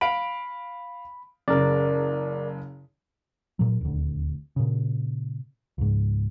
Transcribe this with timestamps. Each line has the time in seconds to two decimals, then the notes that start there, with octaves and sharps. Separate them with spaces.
0.01 F5 B5 D7
1.48 F#1 C#3 A#4 D5
3.59 A#2 F#3
3.81 D#1 D2
4.56 A#2 C#3
5.78 C#2 G#2